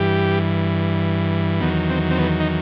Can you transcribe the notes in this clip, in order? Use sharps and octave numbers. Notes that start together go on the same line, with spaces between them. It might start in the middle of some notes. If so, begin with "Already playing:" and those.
Already playing: G2 E3 G4
E2 D#3 F#3 B3
C4
C4
B3
D#4